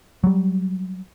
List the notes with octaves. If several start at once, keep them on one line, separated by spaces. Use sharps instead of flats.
F#3 G3